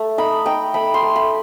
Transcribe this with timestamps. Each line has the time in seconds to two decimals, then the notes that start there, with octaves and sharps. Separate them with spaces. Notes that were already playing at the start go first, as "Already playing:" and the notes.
Already playing: A3
0.18 D#4 B5
0.46 D#4 G5
0.74 A3 B5
0.94 C6
1.02 A3
1.16 B5